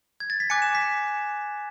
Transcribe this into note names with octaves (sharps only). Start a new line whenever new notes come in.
G#6
A6
B6
G#5 D6 F#6 C#7
E7
B6